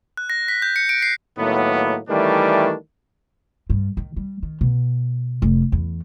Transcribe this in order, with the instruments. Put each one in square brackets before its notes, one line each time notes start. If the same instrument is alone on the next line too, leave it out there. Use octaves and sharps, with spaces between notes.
[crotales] F#6
A#6
B6
G6
C#7
D7
C7
[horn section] A2 D#3 F#3 A#3 B3
D#3 E3 G3 A3 C#4 D4
[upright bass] G2
D#3
G3
D#3
B2
F1
E2